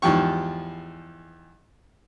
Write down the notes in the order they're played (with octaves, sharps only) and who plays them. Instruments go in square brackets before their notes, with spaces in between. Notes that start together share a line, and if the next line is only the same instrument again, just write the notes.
[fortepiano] E2 G#2 F3 G4 C#6